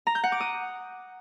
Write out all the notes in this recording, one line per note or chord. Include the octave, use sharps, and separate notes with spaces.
A#5
G6
F#5
D6
D#6